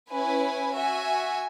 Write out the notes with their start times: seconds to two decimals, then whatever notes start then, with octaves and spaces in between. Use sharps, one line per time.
0.10 C#4 E4 B4 G#5
0.75 F#4 E5 G#5